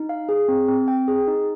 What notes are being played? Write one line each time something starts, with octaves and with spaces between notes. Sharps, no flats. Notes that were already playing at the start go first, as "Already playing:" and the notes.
Already playing: D#4
F5
G#4
C4
C4
G5
G#4
D#4